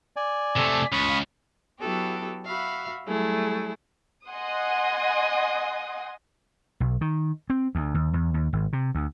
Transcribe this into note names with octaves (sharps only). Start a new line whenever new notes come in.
D5 G#5
C3 A3 A4
C#2 B5 C#6 D#6
F5
F#3 B3 E4 F#4 G4 A4
F#4 E5 F5 B5
F#3 G3 A3 E4 G#4
D#5 F#5 G#5 C6 D#6
B1
D#3
C4
D2
D#2
E2
D#2
G#1
C3
D2